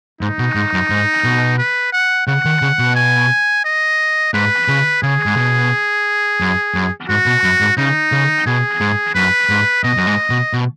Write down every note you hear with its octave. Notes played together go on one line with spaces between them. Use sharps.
G#2 D#4
B2
G#2
F#2
G#2
B2
B4
F#5
C#3 F#5
D#3
C#3
B2
G#5
D#5
G#2 B4
C#3
C#3 G#4
G#2
B2
F#2
F#2
G#2 F#4
B2
F#2
G#2
C#3 D#4
C#3
B2 G#4
G#2
F#2 B4
G#2
B2 D#5
F#2
G#2
B2
B2